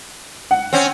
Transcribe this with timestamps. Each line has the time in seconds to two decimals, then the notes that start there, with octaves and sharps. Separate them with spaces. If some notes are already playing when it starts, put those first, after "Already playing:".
0.51 F#5
0.73 C4 C#4